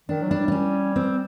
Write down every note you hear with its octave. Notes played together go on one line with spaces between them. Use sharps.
D#3 D4
F#3
G3 D4
D4
C#4
C4